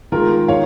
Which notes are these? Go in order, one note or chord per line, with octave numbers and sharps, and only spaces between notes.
D#3 G#3 F4 A#4
D#3 C#5 F5